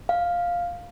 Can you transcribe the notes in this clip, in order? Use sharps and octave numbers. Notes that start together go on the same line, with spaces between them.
F5